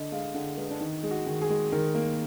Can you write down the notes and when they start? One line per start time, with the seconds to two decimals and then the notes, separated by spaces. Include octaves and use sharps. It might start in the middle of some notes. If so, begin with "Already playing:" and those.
Already playing: D3 D#5
0.12 G#3 F5
0.34 D3 F#5
0.57 G#3 B4
0.70 D4
0.80 D#3 D#4
1.03 G#3
1.11 F#4
1.26 D#3
1.42 G#4
1.50 G#3
1.72 D#3 A#4
1.95 A#3